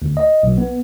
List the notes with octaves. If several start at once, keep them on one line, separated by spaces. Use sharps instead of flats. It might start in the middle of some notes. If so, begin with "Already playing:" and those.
D2
D#5
B1
B3